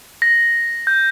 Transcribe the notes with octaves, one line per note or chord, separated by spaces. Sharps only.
A#6
G6